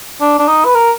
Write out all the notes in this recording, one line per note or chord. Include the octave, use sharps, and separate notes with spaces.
D4
D4
D#4
B4
A#4